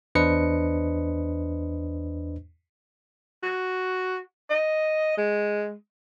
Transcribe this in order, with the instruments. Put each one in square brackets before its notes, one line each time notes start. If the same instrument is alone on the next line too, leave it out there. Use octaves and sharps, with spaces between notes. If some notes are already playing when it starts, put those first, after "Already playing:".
[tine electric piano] E2 D4 B4 C5 D#5 C#7
[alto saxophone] F#4
D#5
G#3